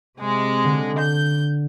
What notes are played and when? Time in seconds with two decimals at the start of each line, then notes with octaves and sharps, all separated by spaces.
0.19 C3 G#3
0.64 D3
0.99 G6